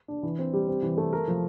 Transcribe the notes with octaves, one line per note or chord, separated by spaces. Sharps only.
D4
E3
C4
G3
C4
E3
A3
A#4
F3